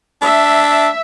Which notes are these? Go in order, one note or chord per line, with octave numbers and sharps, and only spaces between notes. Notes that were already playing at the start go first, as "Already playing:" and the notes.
D4 E5